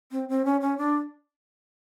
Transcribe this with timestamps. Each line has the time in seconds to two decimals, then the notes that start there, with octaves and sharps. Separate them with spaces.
0.12 C4
0.29 C4
0.45 C#4
0.61 C#4
0.78 D4